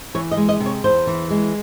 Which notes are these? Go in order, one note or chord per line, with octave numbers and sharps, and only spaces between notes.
E3 C#5
D#5
G#3
D#5
C3
C#5
E2 C5
E3
G#3